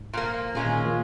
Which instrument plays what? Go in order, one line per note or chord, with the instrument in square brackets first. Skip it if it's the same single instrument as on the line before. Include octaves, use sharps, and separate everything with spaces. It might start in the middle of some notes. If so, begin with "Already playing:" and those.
Already playing: [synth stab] G#2
[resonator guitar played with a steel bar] A#2 F3 A#3
[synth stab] A#2 [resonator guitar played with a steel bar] G#3 C#4 F4 G#4
[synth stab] A#2 D#3
F3 A#3